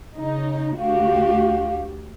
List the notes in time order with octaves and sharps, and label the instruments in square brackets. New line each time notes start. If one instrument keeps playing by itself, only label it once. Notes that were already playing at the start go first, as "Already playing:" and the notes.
[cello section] C#3 D#4
[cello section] D2 F#4 G4 [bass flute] F5